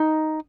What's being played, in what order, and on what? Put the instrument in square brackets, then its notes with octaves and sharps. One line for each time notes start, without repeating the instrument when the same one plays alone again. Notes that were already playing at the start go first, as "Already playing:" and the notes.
Already playing: [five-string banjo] D#4